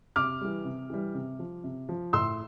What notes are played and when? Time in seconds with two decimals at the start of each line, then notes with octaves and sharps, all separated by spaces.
0.16 C3 D6 F6
0.41 E3 G3
0.65 C3
0.90 E3 G3
1.15 C3
1.39 F3
1.64 C3
1.89 F3
2.13 A2 C6 E6